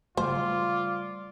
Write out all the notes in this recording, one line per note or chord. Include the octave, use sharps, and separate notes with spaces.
C#3 G3 A3 F4 C5 D5